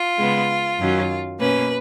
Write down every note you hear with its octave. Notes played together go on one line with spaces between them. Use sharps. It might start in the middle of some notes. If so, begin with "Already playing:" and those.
Already playing: F4
C#3 G#3 B3
F#2 D#3 F#3 C#4
B2 A#3 C#4 B4